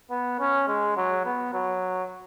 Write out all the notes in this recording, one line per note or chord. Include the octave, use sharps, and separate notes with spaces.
B3
C#4
G#3
F#3
B3
F#3